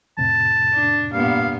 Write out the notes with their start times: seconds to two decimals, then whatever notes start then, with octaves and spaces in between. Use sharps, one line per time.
0.18 F2 A2 C3 A5
0.73 D4
1.13 G2 A#2 B3 F5